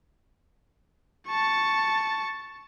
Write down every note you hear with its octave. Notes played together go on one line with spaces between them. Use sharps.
A5 C#6